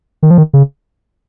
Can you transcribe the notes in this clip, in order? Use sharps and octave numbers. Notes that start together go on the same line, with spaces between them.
D#3
F3
D#3
C#3